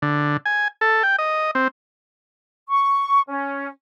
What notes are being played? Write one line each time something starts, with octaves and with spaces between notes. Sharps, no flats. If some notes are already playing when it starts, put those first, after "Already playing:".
D3
G#5
A4
G5
D#5
C4
C#6
C#4